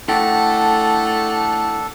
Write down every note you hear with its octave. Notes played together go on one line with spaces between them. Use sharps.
A3 D4 E4 A4 F#5 G5